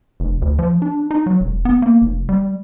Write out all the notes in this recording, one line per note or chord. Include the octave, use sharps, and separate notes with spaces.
F1
D2
F3
D4
D#4
F#3
E1
B3
A#3
F1
G3